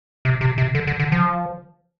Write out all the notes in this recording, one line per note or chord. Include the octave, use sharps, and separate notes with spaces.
C3
C3
C3
D3
D3
D3
F3